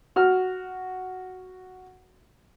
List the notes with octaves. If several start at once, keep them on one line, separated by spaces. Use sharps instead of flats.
F#4 F6